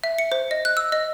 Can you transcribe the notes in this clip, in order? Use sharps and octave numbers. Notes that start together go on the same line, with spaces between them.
E5
C#7
C5
D#5
F#6
E6
D#5